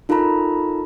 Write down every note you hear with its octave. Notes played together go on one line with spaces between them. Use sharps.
D#4 F4 A4 A#4 A#5 B5